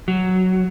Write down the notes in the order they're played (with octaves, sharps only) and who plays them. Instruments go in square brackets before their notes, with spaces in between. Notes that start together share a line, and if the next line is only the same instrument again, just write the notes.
[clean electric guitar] F#3